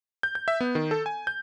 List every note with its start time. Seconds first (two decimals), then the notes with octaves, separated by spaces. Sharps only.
0.23 G6
0.35 G6
0.48 E5
0.60 B3
0.75 D#3
0.91 A4
1.06 G#5
1.27 G6